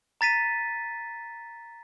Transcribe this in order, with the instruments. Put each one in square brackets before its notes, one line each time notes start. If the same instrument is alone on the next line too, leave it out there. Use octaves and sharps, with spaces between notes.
[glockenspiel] A#5 A6 B6 D#7